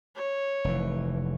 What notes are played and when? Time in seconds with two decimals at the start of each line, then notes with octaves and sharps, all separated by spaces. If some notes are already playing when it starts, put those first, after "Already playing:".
0.16 C#5
0.64 F1 E3